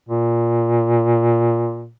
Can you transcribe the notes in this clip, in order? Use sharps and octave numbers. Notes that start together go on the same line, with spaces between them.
A#2